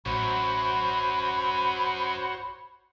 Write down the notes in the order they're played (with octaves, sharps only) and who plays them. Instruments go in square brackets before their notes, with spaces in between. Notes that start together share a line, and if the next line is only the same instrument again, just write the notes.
[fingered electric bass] A1 [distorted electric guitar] F#2 [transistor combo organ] F#4 C5 C#5 [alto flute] B5